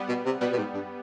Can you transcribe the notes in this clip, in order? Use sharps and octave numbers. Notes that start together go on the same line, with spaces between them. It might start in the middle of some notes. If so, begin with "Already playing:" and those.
Already playing: G3 B3
B2
C3
B2 G3 B3
B2
G#2
G2